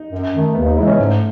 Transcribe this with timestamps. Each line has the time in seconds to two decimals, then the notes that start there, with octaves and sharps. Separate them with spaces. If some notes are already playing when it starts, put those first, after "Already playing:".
Already playing: D#4
0.13 F#2
0.34 D#3 A3
0.55 D#2 B3
0.66 D#4
0.77 C#3 E3 G#3 E4
0.88 C#4
0.98 G#2 A3